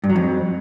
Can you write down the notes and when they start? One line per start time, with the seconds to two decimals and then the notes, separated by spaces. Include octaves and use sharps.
0.04 G2
0.10 F#3
0.16 F2